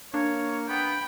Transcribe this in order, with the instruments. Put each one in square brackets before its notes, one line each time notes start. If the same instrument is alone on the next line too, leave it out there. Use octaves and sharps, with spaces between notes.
[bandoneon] A#3 [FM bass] D4 [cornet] C#5
[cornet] B3 [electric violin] G5 [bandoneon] B5